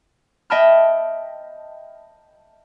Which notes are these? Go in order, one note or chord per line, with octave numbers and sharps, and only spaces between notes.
D#5 E5 G5 A5 B5 F6